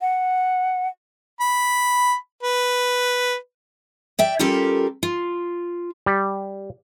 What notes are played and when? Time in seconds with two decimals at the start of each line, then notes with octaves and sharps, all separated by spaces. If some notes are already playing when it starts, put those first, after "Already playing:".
0.01 F#5
1.40 B5
2.43 B4
4.19 D5 E5 G5
4.39 G3 C#4 F4 G4 A4 A#4
5.03 F4
6.06 G3